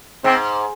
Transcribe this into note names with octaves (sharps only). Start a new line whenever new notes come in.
G#2 C4